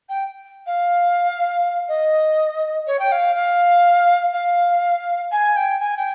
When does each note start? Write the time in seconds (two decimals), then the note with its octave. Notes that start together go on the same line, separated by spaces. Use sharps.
0.09 G5
0.66 F5
1.88 D#5
2.87 C#5
2.99 G5
3.12 F5
3.35 F5
4.33 F5
5.31 G#5
5.56 G5
5.80 G#5
5.97 G5